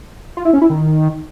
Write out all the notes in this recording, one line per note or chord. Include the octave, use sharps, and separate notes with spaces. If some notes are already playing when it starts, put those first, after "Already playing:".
F4
E4
C#4
E4
D#3